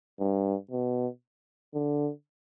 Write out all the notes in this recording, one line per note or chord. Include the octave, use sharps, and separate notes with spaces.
G2
B2
D3